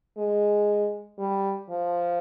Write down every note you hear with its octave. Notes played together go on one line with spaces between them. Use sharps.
G#3
G3
F3